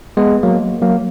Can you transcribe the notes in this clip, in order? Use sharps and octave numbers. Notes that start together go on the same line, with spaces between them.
G#3 B3
F#3 A#3
F#3 A#3